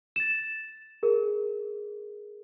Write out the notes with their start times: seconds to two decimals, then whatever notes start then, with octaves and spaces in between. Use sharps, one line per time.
0.16 A6 E7
1.03 G#4 A#4